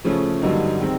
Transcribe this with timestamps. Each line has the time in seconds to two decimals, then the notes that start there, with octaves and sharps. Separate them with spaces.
0.04 C#3 F3 A3 C#4
0.42 G2 D3 F#3 A#3 D#4
0.80 D#3 G#3 C4